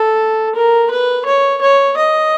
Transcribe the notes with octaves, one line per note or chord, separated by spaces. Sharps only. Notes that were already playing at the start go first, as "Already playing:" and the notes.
Already playing: A4
A#4
B4
C#5
C#5
D#5